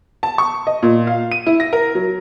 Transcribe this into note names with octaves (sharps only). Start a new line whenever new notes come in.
A5
C#6
D#5
A#2
F5
D#7
E4
A#6
A#4
F#3